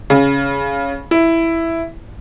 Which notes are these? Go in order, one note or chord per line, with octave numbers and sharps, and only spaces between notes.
C#3
E4